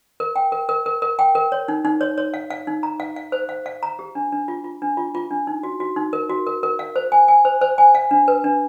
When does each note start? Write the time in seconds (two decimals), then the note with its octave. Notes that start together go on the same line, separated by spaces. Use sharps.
0.20 A#4
0.36 G5
0.52 A#4
0.69 A#4
0.86 A#4
1.02 A#4
1.19 G5
1.35 A#4
1.52 C#5
1.68 D#4
1.85 D#4
2.01 C#5
2.18 C#5
2.34 F5
2.51 F5
2.67 D#4
2.83 A#5
3.00 F5
3.16 F5
3.32 C5
3.49 F5
3.66 F5
3.83 A#5
3.99 G4
4.15 D4
4.32 D4
4.48 F4
4.64 F4
4.82 D4
4.97 F4
5.15 F4
5.31 D4
5.47 D#4
5.63 F#4
5.80 F#4
5.96 D#4
6.13 A#4
6.29 F#4
6.47 A#4
6.63 A#4
6.79 F5
6.96 C5
7.12 G#5
7.28 G#5
7.45 C5
7.61 C5
7.78 G#5
7.95 F5
8.11 D4
8.28 B4
8.44 D4